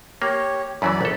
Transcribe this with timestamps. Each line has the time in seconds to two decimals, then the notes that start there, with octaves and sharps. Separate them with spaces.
0.22 A#3 G4 C#5
0.82 F#2 E3 F#3 D5 B5
1.01 A#1 A4